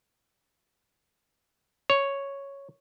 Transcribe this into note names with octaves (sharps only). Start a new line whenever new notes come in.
C#5